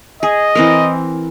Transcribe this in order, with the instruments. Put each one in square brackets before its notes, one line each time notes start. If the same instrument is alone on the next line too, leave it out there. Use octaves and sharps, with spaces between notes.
[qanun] G#4 [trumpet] D#5
[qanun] E3 C4 A#4